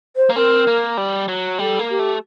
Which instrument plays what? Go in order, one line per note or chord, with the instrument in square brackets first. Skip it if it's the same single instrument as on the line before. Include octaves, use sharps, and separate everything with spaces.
[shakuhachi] C5
[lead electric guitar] A#3
[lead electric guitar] C4 [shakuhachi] A#4
[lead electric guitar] A#3
G3
F#3
[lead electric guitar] G3 [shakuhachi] A4
[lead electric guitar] A#3
[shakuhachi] G4
[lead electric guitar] A3